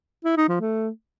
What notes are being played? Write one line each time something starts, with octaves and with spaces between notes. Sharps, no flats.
E4
D#4
F3
A3